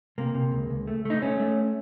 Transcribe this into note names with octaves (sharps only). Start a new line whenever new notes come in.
C3 A#3
C3
C#2
C#2
A3
A3 D#4
A3 C#4
A3